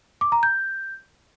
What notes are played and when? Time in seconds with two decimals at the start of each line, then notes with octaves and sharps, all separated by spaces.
0.21 D6
0.32 A#5
0.43 G6